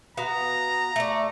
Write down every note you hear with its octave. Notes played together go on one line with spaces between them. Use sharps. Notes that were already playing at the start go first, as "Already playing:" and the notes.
B3 F#4 F5 A#5
A3 D5